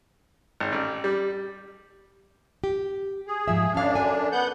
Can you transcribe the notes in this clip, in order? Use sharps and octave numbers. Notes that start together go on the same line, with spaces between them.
G#1
A1
G3
G4
G#4
G#2 F3 E5
F#2 C#4 D4 F5
A4 G#5
B3 F#5 G6